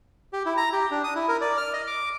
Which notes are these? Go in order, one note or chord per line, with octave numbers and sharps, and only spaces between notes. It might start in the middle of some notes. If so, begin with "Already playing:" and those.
G4
E4
A#5
G4
D4
D#6
E4
A#4
D5
F6
D#5
D6